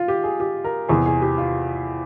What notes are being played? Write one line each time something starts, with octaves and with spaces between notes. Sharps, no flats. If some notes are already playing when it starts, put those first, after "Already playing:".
Already playing: F4
G4
G#4
G4
A#4
E2 C3 E3 G#4
G#4
G4
F4